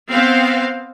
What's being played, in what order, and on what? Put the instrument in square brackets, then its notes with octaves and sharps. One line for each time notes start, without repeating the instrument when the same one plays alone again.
[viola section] B3 C4 F5